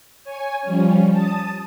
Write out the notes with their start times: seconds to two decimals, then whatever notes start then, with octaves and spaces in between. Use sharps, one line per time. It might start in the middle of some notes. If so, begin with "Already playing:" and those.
0.24 C#5 G#5
0.62 F3 G3 C#4
1.12 A5 D#6